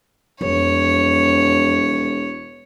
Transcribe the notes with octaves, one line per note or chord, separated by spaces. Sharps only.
E1 F2 C#5